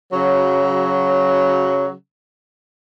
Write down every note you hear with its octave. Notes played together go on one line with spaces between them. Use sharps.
C#3 F#3